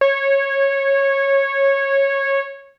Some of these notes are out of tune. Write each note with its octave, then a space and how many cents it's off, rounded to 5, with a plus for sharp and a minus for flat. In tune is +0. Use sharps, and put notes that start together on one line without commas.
C#5 -15